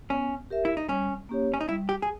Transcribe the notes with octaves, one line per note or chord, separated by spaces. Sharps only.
B3 C#4
G4 A#4 E5
E4
D#4
G3 C#4
A#3 C#4 G4 C#5
C#4
D#4
G3 E4
G4
G#4